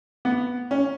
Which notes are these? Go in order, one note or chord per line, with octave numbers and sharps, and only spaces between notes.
B3
C#4